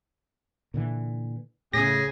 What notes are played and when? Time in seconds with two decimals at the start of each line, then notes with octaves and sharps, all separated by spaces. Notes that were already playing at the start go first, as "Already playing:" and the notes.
0.74 A#2 D3 E3
1.74 A2 C#3 G#4 A#6